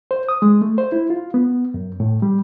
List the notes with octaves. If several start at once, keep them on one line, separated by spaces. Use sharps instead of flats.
C5
D#6
G#3
A3
C5
E4
F4
B3
F#2
A2
G3